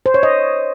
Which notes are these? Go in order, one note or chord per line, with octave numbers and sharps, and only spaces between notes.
C5
C#5
D#5